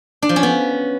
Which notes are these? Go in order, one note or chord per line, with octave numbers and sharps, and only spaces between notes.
D4
F3
C#4
B3